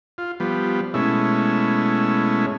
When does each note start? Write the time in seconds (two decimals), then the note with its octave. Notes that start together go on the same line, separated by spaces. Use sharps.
0.18 F4
0.40 F3 G3 B3
0.94 B2 G#3 A3 C#4 E4